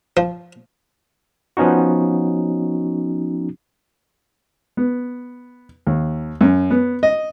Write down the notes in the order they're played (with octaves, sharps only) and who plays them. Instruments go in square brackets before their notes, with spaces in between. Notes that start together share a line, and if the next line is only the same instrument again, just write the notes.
[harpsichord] F3
[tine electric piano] F3 B3 C#4 D#4 F#4
[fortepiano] B3
D#2
F#2
B3
D#5